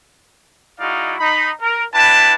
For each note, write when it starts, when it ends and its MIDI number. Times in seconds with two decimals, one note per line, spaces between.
0.80 1.15 56
0.80 1.15 63
0.80 1.15 64
0.80 1.15 66
0.80 1.15 74
0.80 1.15 77
1.20 1.51 63
1.20 1.51 83
1.61 1.85 70
1.94 2.33 62
1.94 2.33 64
1.94 2.33 71
1.94 2.33 79
1.94 2.33 81